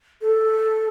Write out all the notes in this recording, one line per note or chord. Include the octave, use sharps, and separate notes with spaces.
A4